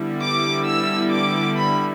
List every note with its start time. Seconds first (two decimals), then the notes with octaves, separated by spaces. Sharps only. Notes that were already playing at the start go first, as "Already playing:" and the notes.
Already playing: D3 G3 B3 E4
0.20 D6
0.65 E6
1.10 D6
1.56 B5